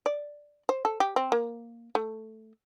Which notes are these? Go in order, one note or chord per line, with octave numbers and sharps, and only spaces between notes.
D5
C5
A4
G4
C4
A#3
A3